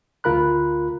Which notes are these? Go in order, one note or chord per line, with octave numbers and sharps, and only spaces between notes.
D2 F4 A#4 B5 F#6